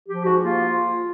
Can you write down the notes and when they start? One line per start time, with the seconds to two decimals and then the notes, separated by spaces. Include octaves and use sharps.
0.09 F3 G4
0.25 G#2 F#4
0.41 A#3 F4